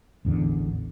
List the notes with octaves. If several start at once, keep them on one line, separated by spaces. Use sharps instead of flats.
A1 E2 D3